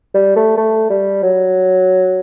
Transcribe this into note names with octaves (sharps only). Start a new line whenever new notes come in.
G3
A3
A3
G3
F#3